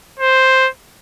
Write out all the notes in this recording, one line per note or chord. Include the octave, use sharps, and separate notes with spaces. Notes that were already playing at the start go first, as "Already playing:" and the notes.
C5